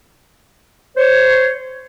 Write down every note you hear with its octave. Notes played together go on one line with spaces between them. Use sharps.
C5 C#5